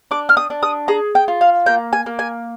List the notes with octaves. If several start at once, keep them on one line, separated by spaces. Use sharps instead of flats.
D4 D6
F6
D#6
D4
D#6
G#4 A#5
G5
F4
F5
A#3 G5
G#5
A#3
G#5